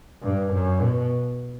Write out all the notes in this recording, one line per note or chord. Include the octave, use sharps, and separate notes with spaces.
G2
F#2
B2